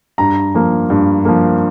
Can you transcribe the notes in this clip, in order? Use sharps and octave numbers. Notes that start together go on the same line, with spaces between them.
G2 A#5
F3 A#3
G2
F3 A#3